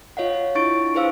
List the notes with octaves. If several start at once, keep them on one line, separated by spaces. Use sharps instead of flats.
F4 C#5 D#5 F5 F#5
D4 E4 C#6 A6 D7
E4 G#4 B4 C5 F5 E6